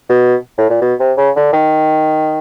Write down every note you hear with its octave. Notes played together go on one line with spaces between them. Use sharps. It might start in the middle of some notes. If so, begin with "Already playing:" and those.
B2
A2
A#2
B2
C3
C#3
D3
D#3